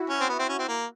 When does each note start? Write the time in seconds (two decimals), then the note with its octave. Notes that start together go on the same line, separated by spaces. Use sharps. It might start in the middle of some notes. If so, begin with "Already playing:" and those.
Already playing: E4 F#4
0.09 C#4
0.20 C4
0.29 B3
0.39 C4
0.49 C#4
0.59 C4
0.68 A#3